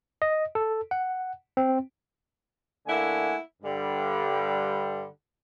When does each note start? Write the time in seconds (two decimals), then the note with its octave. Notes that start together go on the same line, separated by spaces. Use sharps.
0.22 D#5
0.55 A4
0.91 F#5
1.57 C4
2.86 D3 A3 A#3 E4 F#5 G#5
3.62 G2 D3 G3